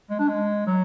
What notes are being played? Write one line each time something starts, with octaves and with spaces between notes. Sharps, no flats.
G#3
D4
G#3
F#3